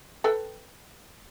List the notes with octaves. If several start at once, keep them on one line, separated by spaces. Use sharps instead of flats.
A4 B4 G5